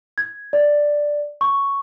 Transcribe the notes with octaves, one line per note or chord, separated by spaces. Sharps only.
G#6
D5
C#6